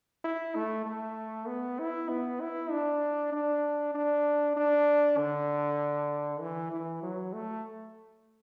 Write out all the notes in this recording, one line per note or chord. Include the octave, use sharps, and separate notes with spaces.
E4
A3
A3
B3
E4
B3
E4
D4
D4
D4
D4
D3
E3
E3
F#3
A3